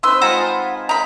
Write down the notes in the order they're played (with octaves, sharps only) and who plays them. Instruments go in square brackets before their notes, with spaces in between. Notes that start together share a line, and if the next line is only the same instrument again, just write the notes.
[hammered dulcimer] C4 D#4 B4 [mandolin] C6 E6
[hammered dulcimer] G#3 F4 G#5 [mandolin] C5 F#5 A#5
[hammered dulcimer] D#4 [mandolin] A#5 B5